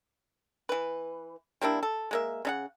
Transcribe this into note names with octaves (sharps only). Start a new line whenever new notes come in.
E3 B4
G3 A#3 D4 E4
A4
G#3 A#3 E5
C#3 D#4 F#5